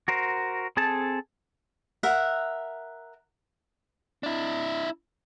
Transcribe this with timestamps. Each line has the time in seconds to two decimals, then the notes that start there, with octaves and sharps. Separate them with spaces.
0.08 F#4 A#4 C5
0.77 C4 G#4 A4 A5
2.03 A#4 E5 F#5
4.23 D4 E4